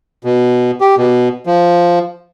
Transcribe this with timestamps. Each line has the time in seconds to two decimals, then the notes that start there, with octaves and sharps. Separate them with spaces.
0.24 B2
0.81 G4
0.97 B2
1.47 F3